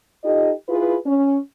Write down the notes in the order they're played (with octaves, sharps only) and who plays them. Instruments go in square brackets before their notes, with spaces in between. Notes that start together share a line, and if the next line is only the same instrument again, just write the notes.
[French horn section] D#4 F4 G4 A4 D#5
E4 F4 G#4 B4
C#4